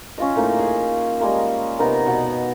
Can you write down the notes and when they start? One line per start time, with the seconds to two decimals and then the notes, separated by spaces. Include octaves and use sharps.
0.18 C#4 F4 D#5
0.35 A2 A#3 D#4
0.59 G#4
1.20 G3 G#3 A#3 A#4
1.79 C3 B3 D#4 A#4
2.06 B2 F#5